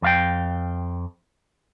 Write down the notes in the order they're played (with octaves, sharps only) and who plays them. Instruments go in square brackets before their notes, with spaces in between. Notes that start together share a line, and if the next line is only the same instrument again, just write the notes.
[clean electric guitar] F2 F5 G5